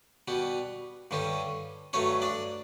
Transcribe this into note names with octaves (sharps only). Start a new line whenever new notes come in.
B2 G3 B3
G2 D3 G3 C#4
G2 F#3 A3 C#4 C#5
D4 D5